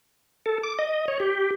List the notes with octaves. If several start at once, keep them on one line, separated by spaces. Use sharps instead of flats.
A4
D6
D#5
C#5
G4